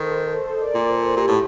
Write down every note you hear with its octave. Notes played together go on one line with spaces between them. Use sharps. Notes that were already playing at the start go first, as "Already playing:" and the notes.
Already playing: D#3 A4 C5
A4 C5
D#5
A#4 D5
A#2
A4 C5
A#2 G4
A2